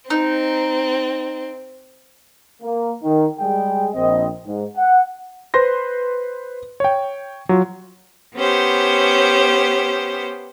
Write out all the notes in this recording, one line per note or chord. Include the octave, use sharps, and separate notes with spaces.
C4 D#4
A#3
D#3
G3 G#3 G#4 G5
A#1 C4 D#5
G#2
F#5
B4 C5 C6 A#6
C#5 G5
F#3 F4
B3 C#4 G4 C5